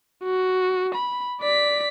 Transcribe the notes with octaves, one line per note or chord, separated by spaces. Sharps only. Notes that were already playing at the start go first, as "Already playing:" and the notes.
F#4
B5
D5 B6